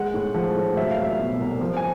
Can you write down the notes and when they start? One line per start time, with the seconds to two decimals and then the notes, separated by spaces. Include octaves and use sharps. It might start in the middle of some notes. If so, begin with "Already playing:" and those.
Already playing: G#3 F#5
0.14 A2
0.34 F3
0.56 A2
0.77 F#3 E5
0.90 F5
0.97 C2
1.05 E5
1.19 B2
1.41 C2
1.61 F3
1.77 G#5